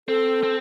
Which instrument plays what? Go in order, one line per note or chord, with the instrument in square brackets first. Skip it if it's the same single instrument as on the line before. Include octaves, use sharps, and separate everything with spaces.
[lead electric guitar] C4 [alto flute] A4
[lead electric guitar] C4